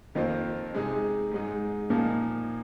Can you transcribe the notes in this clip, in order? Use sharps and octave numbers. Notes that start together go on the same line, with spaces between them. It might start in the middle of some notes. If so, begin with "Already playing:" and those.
F2 D#3 A#3 F4 C5
C3 G#3 D#4 G#4
G#2 G#3 D#4
A#2 F3 A#3 D#4